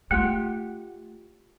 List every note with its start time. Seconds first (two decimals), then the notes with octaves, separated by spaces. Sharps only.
0.11 A3 F4 G4 F#5 G5